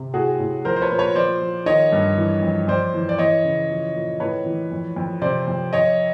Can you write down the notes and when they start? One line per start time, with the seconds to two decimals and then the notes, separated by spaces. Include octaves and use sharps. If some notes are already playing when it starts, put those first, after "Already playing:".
Already playing: C3
0.14 A2 F#4 G#4
0.39 A2
0.65 F3 A#4 C5
0.76 C5
0.82 B4 C#5
0.90 A#2 C5
0.98 B4 C#5
1.15 F3 C5 D5
1.42 F3
1.66 D#3 C#5 D#5
1.92 G2
2.17 E3
2.43 F2
2.68 F2 C5 D5
2.94 E3
3.09 D5
3.18 E3 C#5 D#5
3.44 C#3
3.70 F3
3.95 A#2
4.20 A2 B4 C#5
4.46 E3
4.72 F2
4.96 F2
5.22 C3 C5 D5
5.48 F2
5.73 F2 C#5 D#5